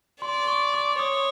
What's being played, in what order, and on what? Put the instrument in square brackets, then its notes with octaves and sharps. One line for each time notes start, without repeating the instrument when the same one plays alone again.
[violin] D5 [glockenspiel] C6
[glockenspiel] C#6
D6
[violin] C#5 [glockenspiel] D#6